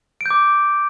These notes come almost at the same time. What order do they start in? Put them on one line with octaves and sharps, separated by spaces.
D7 G6 D6